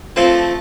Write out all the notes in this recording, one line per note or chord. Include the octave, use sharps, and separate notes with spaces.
F3 A3 C4